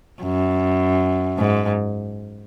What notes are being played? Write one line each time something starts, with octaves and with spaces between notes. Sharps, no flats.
F#2
G#2